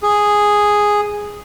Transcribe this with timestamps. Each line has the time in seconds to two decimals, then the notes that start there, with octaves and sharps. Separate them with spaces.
0.03 G#4